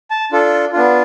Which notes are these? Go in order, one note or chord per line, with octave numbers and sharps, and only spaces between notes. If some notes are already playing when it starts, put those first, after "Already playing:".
A5
D4 F4 A4
B3 D4 F4